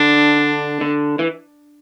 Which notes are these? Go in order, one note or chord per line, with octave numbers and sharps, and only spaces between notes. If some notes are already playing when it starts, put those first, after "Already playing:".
Already playing: D3 D4
D3
E3